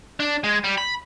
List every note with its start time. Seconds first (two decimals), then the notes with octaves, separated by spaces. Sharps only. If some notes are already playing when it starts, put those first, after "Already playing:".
0.20 D4
0.44 G#3
0.64 G3
0.78 B5